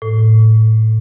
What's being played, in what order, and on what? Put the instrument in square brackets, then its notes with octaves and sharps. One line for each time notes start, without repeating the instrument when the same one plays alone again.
[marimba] A2